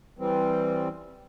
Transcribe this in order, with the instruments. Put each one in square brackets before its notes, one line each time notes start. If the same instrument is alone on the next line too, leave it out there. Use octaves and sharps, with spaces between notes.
[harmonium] E3 G3 C4